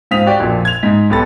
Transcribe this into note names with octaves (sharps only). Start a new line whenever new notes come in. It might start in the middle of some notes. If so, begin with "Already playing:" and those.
G#2 C4 F4 D#6 B6 F7
F#4 G4 D5 G5
A#1 F2 A#2
G#6 F7
G#2 D#4 B6
B1 B3 G4 A4 B5 A6